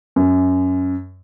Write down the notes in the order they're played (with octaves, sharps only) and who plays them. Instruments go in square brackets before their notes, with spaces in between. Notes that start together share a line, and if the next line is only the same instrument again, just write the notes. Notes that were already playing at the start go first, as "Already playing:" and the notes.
[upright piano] F#2